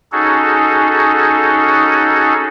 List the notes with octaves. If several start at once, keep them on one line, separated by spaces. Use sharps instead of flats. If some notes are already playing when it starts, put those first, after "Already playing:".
C#4 D#4 F#4 G#4 A4